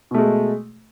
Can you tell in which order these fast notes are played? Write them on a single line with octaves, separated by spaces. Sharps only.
B2 A3 G#3